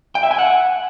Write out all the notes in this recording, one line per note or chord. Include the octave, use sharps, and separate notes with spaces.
G5
E5
G#5
F#5